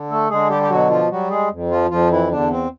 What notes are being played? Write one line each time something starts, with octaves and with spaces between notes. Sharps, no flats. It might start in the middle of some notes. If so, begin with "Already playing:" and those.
Already playing: D3
A3 A4
D3 G#3 G#4
G3 G4
G4
B2 F#3 F#4
F3 F4
F#3 G3 F#4
G#3 G#4
F2
F3 F4
F2 F3 F4
E3 E4
E2 D3 D4
C4